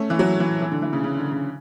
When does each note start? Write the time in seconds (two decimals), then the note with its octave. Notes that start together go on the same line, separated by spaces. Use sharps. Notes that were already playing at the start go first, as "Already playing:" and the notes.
Already playing: A3 C#4
0.10 E3
0.19 F#3
0.40 E3
0.62 E3
0.72 D3
0.82 E3
0.93 C#3
1.04 C#3
1.17 D3
1.32 C#3